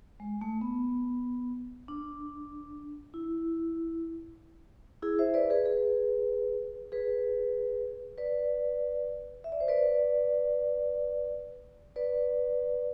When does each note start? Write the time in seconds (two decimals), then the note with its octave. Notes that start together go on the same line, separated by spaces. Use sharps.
0.20 G#3
0.41 A3
0.61 B3
1.88 D4
3.14 E4
5.02 E4 G#4
5.19 C5 E5
5.34 B4 D5
5.50 G#4 B4
5.66 G#4 B4
6.92 G#4 B4
8.18 B4 D5
9.44 E5
9.52 D5
9.60 C5
9.68 B4 D5
11.96 B4 D5